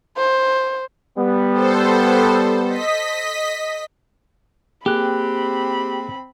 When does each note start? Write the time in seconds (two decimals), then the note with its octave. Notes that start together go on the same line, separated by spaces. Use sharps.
0.18 C5
1.18 G3 B3
1.54 A4 C5
2.68 D#5 B6
4.86 A#3 C4 G4 G#4 B5 F#6